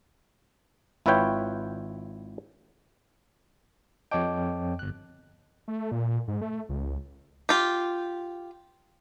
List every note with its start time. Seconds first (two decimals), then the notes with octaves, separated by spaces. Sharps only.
1.06 G#1 E4 F4 B4 C#5 G5
4.11 F2 C#5 D#5 G5 A5 D6
4.79 G1 F#6
5.68 A3
5.92 A#2
6.28 G#2
6.42 A3
6.69 C#2
7.49 F4 G4